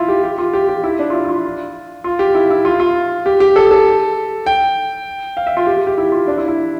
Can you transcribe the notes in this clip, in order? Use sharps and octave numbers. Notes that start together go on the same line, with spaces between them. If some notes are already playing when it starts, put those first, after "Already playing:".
Already playing: E4 F4
G4
G4
F4
G4
G4
E4
D4
F4
E4
E4
F4
F4
G4
E4
E4
F4
F4
G4
G4
A4
A4
G5
F5
E5
F4
G4
G4
G4
E4
F4
D4
E4
E4